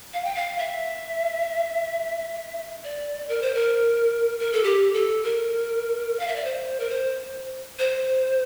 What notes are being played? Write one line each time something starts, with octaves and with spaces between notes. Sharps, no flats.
F5
G5
F5
E5
D5
A#4
C5
A#4
A#4
A4
G4
A4
A#4
F5
E5
D5
C5
A#4
C5
C5